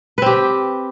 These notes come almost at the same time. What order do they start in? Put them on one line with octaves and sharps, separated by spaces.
B4 C4 G4